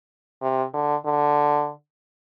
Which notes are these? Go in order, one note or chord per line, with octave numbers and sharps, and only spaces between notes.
C3
D3
D3